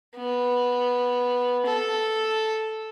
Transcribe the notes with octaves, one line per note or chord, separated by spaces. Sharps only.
B3
A4